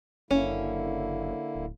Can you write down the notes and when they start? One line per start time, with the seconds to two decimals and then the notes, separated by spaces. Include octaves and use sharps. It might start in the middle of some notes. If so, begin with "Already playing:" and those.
0.31 F#1 D3 A#3 C#4 E4
1.55 D1